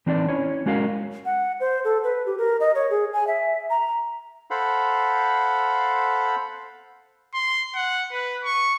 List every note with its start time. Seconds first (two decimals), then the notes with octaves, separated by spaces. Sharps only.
0.06 E3 C4 D4 D#4 B4 D5
0.29 C#4 E4 C#5
0.66 G#3 C#4 F#4 A#4 F5
1.25 F#5
1.60 C5
1.84 A4
2.04 B4
2.26 G4
2.38 A#4
2.60 D#5
2.75 C#5
2.90 G#4
3.13 G#5
3.27 E5
3.70 A#5
4.51 A4 C5 F5 F#5 B5
7.34 C6
7.75 F#5
8.12 B4
8.44 C#6